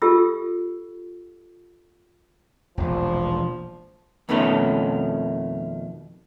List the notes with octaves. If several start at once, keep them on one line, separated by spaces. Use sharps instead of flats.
F4 G4 A4 E6
E1 A#1 F3
F2 B2 D#3 A3 C#4